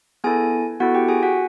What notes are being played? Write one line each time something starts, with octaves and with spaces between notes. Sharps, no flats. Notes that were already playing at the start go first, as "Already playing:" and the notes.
B3 E4 G#4 A4 G#5
B3 E4 F#4 A4 F#5
G4 G5
G#4 G#5
F#4 F#5